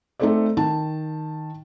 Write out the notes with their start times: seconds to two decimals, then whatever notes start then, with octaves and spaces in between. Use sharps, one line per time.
0.20 A3 C4 D#4 A4 C5 D5
0.57 D#3 A5